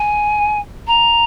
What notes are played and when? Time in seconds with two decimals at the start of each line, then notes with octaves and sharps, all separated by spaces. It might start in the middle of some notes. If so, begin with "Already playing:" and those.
Already playing: G#5
0.87 A#5